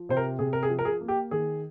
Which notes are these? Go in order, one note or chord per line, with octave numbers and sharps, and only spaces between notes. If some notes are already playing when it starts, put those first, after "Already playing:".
Already playing: F3
C3 C5
A#4
C3 G#4
A#4
G#4
F3
A#4
G#4
A#3
G4
D#3 G#4